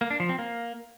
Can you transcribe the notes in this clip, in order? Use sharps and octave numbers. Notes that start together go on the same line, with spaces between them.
A#3
D4
F3
C4
A#3